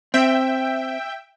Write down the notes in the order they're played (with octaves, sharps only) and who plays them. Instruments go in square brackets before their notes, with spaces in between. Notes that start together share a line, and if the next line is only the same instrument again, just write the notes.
[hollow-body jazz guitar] C4 [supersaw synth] E5 G5